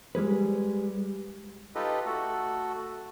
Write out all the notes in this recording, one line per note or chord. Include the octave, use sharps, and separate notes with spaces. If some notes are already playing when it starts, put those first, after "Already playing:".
G3 G#3 G#4 B4
D#4 F4 G4 A4 B4 D#5
A3 F#4 A4